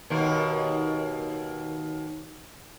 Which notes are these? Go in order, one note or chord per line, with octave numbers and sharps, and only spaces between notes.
D#2 B2 A#3